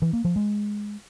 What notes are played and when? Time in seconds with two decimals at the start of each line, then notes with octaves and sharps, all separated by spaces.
0.02 E3
0.13 A#3
0.25 F3
0.36 G#3